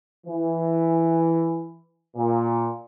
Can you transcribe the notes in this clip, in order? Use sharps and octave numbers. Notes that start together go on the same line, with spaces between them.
E3
A#2